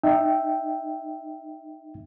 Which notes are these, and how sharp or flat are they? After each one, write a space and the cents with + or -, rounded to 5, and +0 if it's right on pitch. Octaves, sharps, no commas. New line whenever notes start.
D#4 -30 E5 +0 G5 +0